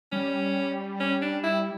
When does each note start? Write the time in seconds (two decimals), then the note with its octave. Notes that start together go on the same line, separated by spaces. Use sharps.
0.12 G3 C#4
1.00 C#4
1.22 D4
1.44 E4